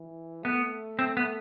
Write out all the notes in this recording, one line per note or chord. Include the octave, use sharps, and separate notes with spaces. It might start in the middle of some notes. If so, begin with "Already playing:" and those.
Already playing: E3
A3 B3
C4
B3